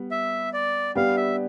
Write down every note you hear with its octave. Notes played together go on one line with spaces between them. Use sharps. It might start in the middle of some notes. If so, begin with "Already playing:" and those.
Already playing: G3 B3
E5
D5
G3 B3 D4 G4 F5
E5